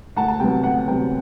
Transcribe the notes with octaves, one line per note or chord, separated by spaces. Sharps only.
D2 F#5 A5
A5
C3 F#3 B3 G5
D2 F#5
C3 F#3 B3 G5